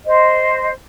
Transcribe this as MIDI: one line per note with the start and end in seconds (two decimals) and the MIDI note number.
0.06 0.69 72
0.06 0.69 75